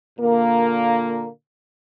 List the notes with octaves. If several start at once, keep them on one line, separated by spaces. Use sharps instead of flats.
A#2 D3 A#3